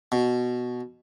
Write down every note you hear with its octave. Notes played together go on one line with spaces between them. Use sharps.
B2